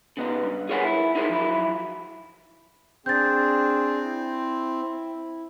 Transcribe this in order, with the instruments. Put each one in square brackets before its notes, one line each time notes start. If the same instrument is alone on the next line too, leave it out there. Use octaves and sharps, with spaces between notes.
[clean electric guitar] C#3 B3 D#4
G2
G#4 A#4 B4 C#5 F#5 G#5
E4
D#4 E4 G#4 A#4 C5
F3 F#3 E4
[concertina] C4 [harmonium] D4 G#4 [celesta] G6 A6
[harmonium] E4